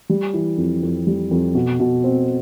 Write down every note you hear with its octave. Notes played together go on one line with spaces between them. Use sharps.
G3
E3
F2
F2
G3
F2
B2
B2
C4